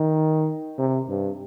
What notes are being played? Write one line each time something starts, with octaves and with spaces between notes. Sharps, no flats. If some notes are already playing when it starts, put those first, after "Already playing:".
Already playing: D#3
C3
G2